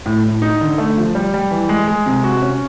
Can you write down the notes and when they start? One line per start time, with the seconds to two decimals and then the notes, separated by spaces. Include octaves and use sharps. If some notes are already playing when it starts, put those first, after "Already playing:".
0.06 A2
0.24 A2
0.42 D#4
0.61 D3
0.78 A3
0.97 F3
1.15 G3
1.34 G3
1.51 E3
1.69 G#3
1.88 G#3
2.06 C3
2.24 F#4
2.42 C#4